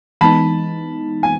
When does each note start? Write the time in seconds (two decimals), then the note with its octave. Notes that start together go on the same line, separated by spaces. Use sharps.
0.21 E3 G#3 B3 D#4 A5 B5
1.23 G#5